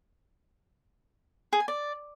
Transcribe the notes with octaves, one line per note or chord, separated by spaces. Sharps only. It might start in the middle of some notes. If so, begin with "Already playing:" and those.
G#4
G#5
D5